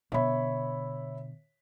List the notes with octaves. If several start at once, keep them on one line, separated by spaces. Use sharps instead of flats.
B2 D3 C#5 E5 B5